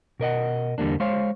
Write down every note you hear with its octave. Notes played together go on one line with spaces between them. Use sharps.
B2 A#4 D#5 F#5
E2 D3 G3 A#3 D4
G#3 C5 C#5 F5